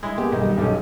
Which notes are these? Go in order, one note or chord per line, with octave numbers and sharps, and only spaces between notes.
G#3 E4
A#3 B3 G4 G#4
B1 D#3 G3
B1 G3 C#4